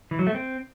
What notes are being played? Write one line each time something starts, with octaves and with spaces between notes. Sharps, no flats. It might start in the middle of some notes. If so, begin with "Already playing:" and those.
E3
F#3
A3
C4